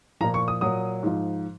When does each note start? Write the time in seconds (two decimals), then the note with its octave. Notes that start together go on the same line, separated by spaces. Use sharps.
0.21 F3 A#5
0.23 A#2
0.34 C#6
0.48 D#6
0.61 A#2 F#3 D#6
1.03 G#2 F3